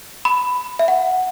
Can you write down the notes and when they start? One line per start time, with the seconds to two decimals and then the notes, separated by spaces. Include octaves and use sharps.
0.25 B5
0.79 E5
0.88 F#5